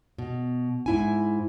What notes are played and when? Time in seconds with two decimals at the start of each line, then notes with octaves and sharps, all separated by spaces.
0.18 B2
0.86 G#2 E4 G#5